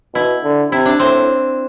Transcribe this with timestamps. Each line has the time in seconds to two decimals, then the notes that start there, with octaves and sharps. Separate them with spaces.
0.14 B2 E4
0.44 D3
0.71 C3 E4
0.85 D4
0.99 A2 C4